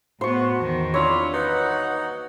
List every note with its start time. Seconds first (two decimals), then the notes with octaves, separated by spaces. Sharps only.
0.21 A2 B3 F#4 C5 C#6
0.61 E2 D#3
0.94 C3 D4 E4 F4 C#5
1.32 A#3 D#4 F#4 B4 F#5